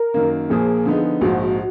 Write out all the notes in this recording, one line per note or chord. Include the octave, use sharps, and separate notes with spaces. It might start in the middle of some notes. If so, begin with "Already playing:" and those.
Already playing: A#4
F#2 D#3 A#3
A#1 A#2 F3 A#3 G#4
D3 F3 B3 D#4
A#1 G#2 F3 F#4